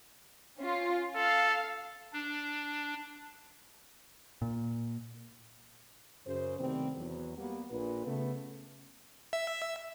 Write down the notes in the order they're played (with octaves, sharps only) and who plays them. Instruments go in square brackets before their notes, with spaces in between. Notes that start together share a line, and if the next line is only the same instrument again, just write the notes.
[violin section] C#4 F4
[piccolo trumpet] A4 [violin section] F5
[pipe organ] D4
[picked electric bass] A#2
[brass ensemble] F#2 C#3 C5
C3 D#3 G3 A3 B3 C4
E2 F#3
G3 A#3 B3
A#1 A#2 B4
C#3 A3 B3
[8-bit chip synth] E5